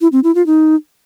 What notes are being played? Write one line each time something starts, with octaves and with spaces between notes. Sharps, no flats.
E4
C4
E4
F4
D#4